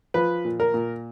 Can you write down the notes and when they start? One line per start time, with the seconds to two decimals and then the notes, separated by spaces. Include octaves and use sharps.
0.14 F3 B4
0.45 A#2
0.60 A#4
0.74 A#2